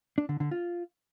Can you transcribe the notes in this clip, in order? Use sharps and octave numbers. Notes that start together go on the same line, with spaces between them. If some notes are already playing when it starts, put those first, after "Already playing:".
D4
D3
D3
F4